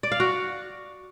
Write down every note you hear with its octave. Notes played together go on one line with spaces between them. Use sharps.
D5
F5
F#4